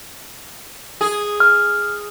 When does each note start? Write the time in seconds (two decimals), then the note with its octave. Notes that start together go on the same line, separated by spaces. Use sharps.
1.01 G#4
1.40 F6